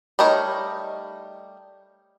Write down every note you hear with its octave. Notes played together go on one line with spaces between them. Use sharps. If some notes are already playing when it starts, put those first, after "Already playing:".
G3 A3 D#4 A#4 C#5